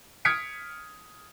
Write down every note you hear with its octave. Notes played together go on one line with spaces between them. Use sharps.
D#6 F6 G#6 B6 C#7 D7